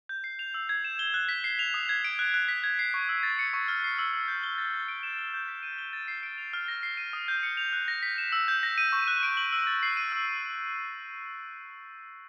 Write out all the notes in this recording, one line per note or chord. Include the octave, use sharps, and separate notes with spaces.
G6
C7
F7
E6
G#6
E7
G7
F#6
B6
C7
F7
D#6
G#6
D7
F#6
F#6
B6
G#6
C7
C#6
E6
A6
C#7
C#6
F6
C7
E6
E6
G6
G7
A6
A6
D7
E7
G7
G6
B6
D#7
G7
A6
C7
D7
F7
F6
A#6
C7
D#7
D#6
G6
C#7
F7
F#6
A#6
B6
E7
E6
G6
A#6
D#7
C#6
F#6
D7
F#7
E6
A6
C7
D#7
E6